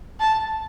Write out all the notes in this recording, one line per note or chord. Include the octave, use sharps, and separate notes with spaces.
A5